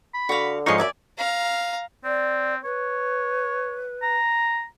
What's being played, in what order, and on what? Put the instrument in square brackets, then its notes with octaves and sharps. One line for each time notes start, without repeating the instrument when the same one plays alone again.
[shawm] B5
[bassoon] D3 [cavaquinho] F#4 F5
[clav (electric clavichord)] G#2 F3 D#4 [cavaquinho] C#5 D#5 [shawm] C6
[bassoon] F#2 [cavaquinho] D5 G#5 D6 [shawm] E5
[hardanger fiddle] F5 A#5
[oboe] C4 [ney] D5
[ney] B4 [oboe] C#5
[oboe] A#5